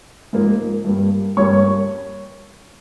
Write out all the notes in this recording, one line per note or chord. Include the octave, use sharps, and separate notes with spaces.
G#2 F3 A#3
G2 G3 A#3
G2 G3 A#3 C#5 C#6